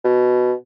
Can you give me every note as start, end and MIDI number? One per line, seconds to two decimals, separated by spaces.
0.04 0.53 47